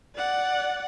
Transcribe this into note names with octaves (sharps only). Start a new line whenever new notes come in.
D5 F#5